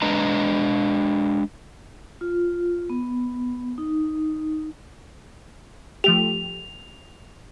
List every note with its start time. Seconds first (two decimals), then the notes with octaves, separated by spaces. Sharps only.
0.02 G#3 D4 B4 D#5 A#5
2.21 F4
2.90 B3
3.78 D#4
6.04 F3 A3 G4 F7